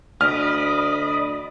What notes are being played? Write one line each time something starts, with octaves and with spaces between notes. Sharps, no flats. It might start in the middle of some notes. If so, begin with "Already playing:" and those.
D2 D5 D#5 B5 D#6 F6